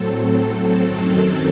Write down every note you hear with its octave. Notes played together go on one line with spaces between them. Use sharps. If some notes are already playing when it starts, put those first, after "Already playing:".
Already playing: A2 F#3 C4 A4
A4
F#2 D#3 F#3 C4